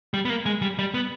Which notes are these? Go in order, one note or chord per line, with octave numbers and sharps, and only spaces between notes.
G3
B3
A#3
G#3
G3
G3
B3